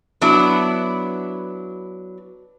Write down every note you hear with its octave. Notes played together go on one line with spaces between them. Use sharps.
F#3 B3 D4 E4